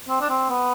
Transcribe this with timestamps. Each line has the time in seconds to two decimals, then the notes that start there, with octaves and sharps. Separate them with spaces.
0.09 C4
0.21 D4
0.30 C4
0.50 B3